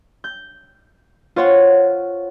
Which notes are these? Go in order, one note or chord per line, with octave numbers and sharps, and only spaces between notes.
G6
F4 C5 C#5 F#5